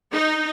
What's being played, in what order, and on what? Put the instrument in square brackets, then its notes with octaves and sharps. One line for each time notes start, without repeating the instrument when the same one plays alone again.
[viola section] D#4